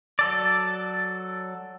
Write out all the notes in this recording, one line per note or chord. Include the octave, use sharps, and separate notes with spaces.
F#3 A4 D5